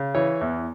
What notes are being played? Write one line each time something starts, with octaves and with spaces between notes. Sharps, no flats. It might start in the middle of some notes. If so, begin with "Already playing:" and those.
Already playing: C#3
E3 C#5
E2